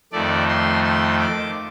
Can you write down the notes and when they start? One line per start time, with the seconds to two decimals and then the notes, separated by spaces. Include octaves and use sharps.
0.13 F2 D#3 A3 D5
0.48 C6
0.84 C6
1.19 D6